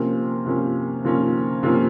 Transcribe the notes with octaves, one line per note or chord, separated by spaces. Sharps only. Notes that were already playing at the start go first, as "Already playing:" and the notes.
Already playing: C3 F3 A#3 C#4
C3 F3 A#3 C#4
C3 F3 A#3 C#4
C3 F3 A#3 C#4